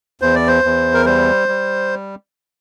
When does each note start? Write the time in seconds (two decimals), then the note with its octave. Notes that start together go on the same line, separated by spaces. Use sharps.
0.21 E2 C5
0.35 D5
0.48 C5
0.64 E2
0.94 A#4
1.05 G3 C5
1.48 G3